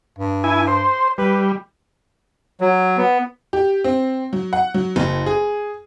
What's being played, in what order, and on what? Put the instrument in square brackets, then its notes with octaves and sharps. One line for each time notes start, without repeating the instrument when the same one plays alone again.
[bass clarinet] G2
[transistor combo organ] E4 G#5
C5
[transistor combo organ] G3 [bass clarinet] B4
[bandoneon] F#3
B3
[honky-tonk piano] G4
C4
F#3
F#5
F#3
F#1
G#4